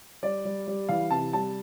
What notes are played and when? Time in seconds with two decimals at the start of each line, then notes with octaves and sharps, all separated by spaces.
0.23 G3 D5
0.45 G3
0.67 G3
0.89 E3 F5
1.11 C3 A5
1.33 G3 A5